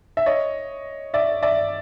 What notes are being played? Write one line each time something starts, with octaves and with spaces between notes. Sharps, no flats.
E5
C#5 D#5
D5 E5
D5 E5